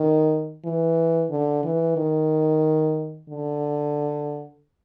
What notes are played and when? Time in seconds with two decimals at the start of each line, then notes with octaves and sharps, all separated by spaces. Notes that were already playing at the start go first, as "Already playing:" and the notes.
Already playing: D#3
0.65 E3
1.30 D3
1.64 E3
1.97 D#3
3.29 D3